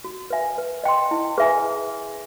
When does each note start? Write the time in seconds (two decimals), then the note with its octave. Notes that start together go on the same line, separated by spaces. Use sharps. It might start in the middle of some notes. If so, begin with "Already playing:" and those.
0.04 F#4
0.30 B4 E5 G#5
0.58 B4
0.84 D#5 G5 C6
1.11 E4
1.38 G#4 B4 E5 G#5